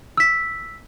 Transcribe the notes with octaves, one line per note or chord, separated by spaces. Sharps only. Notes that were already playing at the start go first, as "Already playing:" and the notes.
E6 B6